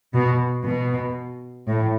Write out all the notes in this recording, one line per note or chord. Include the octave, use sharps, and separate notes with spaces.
B2
B2
A2